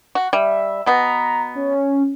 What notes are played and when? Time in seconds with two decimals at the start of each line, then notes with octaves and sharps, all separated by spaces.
0.15 F#4
0.33 G3 E5
0.86 B2 B3 A#5
1.55 C#4